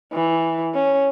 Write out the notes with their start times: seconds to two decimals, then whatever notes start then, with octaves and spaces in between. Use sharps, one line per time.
0.13 E3
0.74 C#4